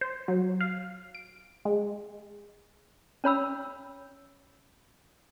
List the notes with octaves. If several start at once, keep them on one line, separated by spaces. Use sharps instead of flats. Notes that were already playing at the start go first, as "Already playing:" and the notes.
C5
F#3
F5
D7
G#3
C#4 C#5 B5 E6